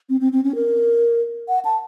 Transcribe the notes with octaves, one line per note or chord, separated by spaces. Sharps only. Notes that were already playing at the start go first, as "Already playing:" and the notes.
C4
C4
C4
C#4
A#4
F#5
A5